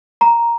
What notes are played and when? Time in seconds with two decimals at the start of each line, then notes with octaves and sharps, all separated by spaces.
0.21 A#5